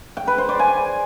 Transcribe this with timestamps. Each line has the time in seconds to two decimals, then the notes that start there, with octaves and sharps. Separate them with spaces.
0.17 G5
0.27 B4
0.38 C5
0.49 D5
0.59 G#5